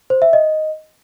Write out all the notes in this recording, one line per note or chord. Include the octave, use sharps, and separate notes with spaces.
C5
E5
D#5